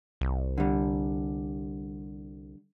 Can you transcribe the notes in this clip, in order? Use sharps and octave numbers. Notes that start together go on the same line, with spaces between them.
C2
D3 G3